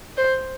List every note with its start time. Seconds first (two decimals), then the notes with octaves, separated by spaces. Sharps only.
0.17 C5